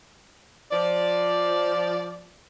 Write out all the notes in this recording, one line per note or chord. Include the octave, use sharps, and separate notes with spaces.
F3 D5